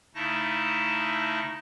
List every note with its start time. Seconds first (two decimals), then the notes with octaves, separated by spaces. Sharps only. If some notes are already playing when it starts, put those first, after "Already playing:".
0.15 C#3 A3 D#4 E4 A5 A#6